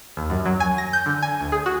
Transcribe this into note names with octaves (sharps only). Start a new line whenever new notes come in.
D#2
F#2
F#3
G#5
A#6
G6
D3
G#5
D2
G#4
F#4